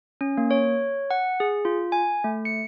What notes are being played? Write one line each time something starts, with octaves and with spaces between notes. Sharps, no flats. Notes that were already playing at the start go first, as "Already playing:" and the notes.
C#4
A#3
C#5
F#5
G#4
F4
G#5
A3
C#7